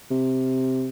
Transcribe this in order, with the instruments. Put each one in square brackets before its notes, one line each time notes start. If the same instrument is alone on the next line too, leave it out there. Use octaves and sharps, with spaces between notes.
[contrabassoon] C3